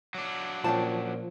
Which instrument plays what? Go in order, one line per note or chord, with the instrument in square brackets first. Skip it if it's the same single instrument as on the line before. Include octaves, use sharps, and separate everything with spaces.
[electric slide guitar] F#3 D4
[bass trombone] A#2 [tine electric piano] F3 [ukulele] C#4 G5 A5